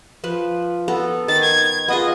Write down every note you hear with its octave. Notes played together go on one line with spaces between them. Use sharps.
F3 B4
B3 A4 A#5
D#3 A6
G#6
B3 F4 G#4 D#5